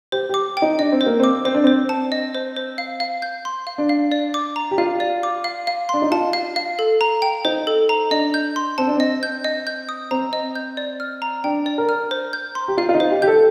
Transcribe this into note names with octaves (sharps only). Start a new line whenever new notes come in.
G4 C5
G4 D6
G5
D#4
D4 D#5
C4
C5
A#3
C4 D6
C4 C5
D4
C4 C5
A5
D#5
C5
C5
F5
F5
G6
C6
F5
D4
F5
D5
D6
A#5
G4
F4 F5
D5
D6
F5
F5
D4 C6
D#4
F4 A5
F5
F5
A4
A#5
G5
D#4 C5
A4
A#5
D4 D#5
G6
C6
C4 A5
D4
C4 D#5
G6
D#5
G6
D#6
C4 A#5
D#5
G6
D5
F6
A#5
D4 G5
D5
A#4
F6
C5
G6
C6
G4
F4 F5
F4
D#4
C5
G4
G4 G6
A4